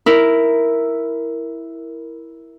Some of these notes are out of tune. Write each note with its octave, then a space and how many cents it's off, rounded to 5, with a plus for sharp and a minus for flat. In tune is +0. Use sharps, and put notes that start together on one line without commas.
E4 +0 A#4 +0